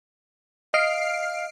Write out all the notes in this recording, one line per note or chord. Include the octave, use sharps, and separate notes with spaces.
D#5 F5 F6 C7 D7